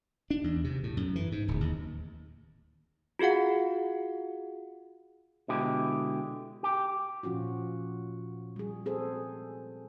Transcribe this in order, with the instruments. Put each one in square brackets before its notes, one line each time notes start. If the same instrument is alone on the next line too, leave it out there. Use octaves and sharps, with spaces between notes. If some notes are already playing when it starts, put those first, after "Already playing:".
[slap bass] D4
E2
C3
A2
F#2
E3
G#2
D1
D#2
[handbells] F4 F#4 G#4 F5 F#5
[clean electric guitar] B2 D3 G#3 E4 G4
G4
[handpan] A#2 F3 C#4 F4 F#4
G3 G#4
C4 G#4 A4 C5